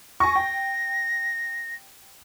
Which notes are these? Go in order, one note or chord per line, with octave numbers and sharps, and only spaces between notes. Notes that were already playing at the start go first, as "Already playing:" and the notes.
G#5 C#6 A#6
G5